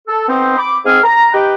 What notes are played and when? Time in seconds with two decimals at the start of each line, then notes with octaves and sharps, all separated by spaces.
0.07 A4
0.27 B3 C4 D#4 C5
0.56 B5 D6
0.85 G#2 C4 G#4 F6
1.03 A#5
1.32 D#4 G4 B4 G5